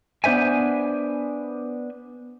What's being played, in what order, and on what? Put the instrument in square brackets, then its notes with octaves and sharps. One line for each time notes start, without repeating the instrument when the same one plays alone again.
[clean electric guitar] B3 D4 C5 E5 G#5